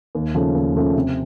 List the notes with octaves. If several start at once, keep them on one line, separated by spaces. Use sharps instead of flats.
D#2
C#3 F3 A3
D#2
C#3 F3 A3
C3